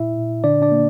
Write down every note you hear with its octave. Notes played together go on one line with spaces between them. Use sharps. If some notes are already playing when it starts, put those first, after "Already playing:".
Already playing: A#2 E4 E5
A#2
D3 D4 D5
D4 D5
A#3